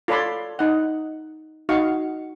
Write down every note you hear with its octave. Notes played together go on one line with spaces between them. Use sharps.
F4 A4 C#5 D5 B5 C6
D#4 F#5
D#4 F#4 F5 C#6